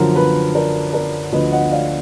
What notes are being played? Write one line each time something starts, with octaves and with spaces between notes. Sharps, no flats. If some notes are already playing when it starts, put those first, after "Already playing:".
Already playing: F#2 D3 F3 A#4
B4
A#4 D5
A#4 D5
D2 D3 F3 B4 D#5
D#5 F#5
D5 F5